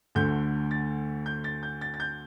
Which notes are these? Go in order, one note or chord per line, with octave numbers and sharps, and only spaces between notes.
D2 D3 A3 G6
A6
G6
A6
G6
A6
A6
G6